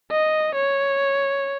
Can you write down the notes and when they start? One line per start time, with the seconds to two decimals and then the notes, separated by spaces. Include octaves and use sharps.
0.11 D#5
0.55 C#5